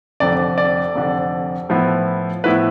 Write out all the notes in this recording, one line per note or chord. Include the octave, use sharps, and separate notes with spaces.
F1 F2 D3 D5
D5
F1 F2 D3
A2 F3 B3 E4
A2 F3 B3 E4 B4